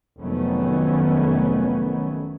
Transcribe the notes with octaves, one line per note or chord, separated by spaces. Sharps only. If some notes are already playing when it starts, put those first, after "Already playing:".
F1 D#3 F#3 A3 B3 C#4